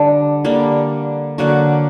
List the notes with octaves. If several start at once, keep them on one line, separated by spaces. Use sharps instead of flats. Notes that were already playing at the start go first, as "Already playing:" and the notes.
Already playing: D3 G3 D4
D3 G3 A#3
D3 F#3 A#3 F#4